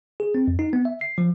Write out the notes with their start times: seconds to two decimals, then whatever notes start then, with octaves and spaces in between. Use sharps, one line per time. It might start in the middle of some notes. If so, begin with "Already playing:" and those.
0.20 G#4
0.35 C4
0.48 F2
0.59 D#4
0.73 B3
0.85 E5
1.01 C7
1.18 F3